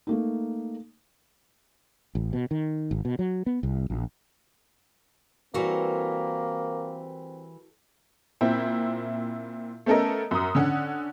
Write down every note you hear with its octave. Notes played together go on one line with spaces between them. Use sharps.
A3 A#3 D#4
A1
B2
D#3
G#1
B2
F#3
B3
C2
A#1
E3 G3 A#3 C4 F#4 A4 A#4
A#2 C4 E4
A3 B3 C#4 A4 A#4 D#5
F#2 D#6
D3 C#4 F#5